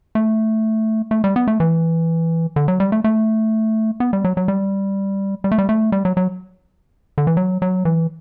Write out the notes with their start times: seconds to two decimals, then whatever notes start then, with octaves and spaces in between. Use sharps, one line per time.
0.15 A3
1.11 A3
1.24 G3
1.36 B3
1.47 A3
1.60 E3
2.56 D3
2.68 F#3
2.80 G3
2.92 A3
3.04 A3
4.00 B3
4.13 G3
4.24 F#3
4.37 F#3
4.48 G3
5.44 G3
5.52 A3
5.58 G3
5.69 A3
5.92 G3
6.05 F#3
6.17 F#3
7.18 D3
7.27 E3
7.37 F#3
7.62 F#3
7.85 E3